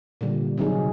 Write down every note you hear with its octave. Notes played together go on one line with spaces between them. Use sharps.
A#2 D3 G3
C3 F#3 D#4 G#4